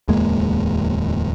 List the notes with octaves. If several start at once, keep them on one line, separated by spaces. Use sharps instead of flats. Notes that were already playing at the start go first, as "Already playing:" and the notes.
D1 E2 G#3 A#3